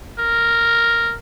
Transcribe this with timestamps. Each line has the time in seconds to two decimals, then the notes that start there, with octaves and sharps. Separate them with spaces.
0.19 A#4